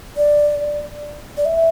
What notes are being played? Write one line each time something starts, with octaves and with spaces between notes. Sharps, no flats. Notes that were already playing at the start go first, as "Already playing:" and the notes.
D5
D5
E5